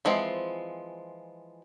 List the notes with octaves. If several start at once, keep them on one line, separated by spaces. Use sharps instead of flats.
E3 F3 G#3 C4